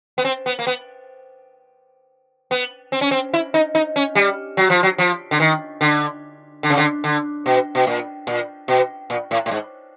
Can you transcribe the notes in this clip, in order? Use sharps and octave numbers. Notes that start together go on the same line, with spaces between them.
B3
C4
B3
A#3
B3
B3
C4
C#4
C4
E4
D#4
D#4
C#4
G3
F#3
F3
F#3
F3
D3
D#3
D3
D3
C#3
D3
D3
B2
B2
A#2
A#2
B2
A#2
A2
A2
G#2